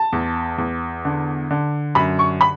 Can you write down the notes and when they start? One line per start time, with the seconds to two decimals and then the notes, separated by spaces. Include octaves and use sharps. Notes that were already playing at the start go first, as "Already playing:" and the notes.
Already playing: A5
0.12 E2
0.58 E2
1.05 D3
1.51 D3
1.95 F#2 B5
2.19 C#6
2.41 B5